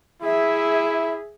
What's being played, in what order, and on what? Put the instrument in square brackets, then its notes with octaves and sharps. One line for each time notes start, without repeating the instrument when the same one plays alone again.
[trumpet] E4 [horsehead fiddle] G#4 E5